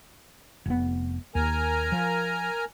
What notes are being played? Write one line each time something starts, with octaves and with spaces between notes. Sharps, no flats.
F1 B3
D#2 A#4 G#5 A#5
F3